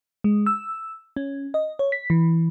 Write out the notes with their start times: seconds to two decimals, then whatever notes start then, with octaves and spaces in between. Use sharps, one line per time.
0.24 G#3
0.46 E6
1.16 C#4
1.54 D#5
1.79 C#5
1.92 B6
2.10 E3